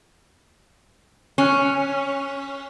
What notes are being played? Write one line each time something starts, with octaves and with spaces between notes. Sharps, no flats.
C#4